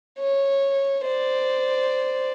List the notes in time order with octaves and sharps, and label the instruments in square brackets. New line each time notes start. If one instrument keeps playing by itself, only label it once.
[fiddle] C#5
C5 D5